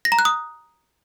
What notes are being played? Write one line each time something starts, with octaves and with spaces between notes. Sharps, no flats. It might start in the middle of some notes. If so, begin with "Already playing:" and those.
A#6
A#5
F#6
D#6